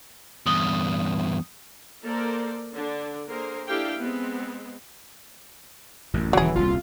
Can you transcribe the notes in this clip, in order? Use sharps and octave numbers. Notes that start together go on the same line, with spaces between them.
E2 G2 D#6 F#7 G7
A#3 A4 A#4 C5 D5
D3 D4
D3 A#3 G#4 A#4 C5
D4 E4 G4 A4 F5 G5
G#3 B3 C4
A1 F#2
D#1 C#3 E3 F#3 G#4
D#1 C2 F4